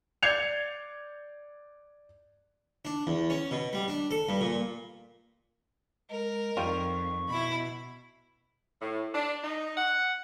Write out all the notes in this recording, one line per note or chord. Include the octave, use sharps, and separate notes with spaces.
D5 G6 G#6 C7 C#7 F7
D4
E2
C#4
B2
G3
D4
A4
G2
A#2
G#3 A#4
F2 D#3 G3 F4 C#6
B2 E4 B5
A2
D4
D#4
F#5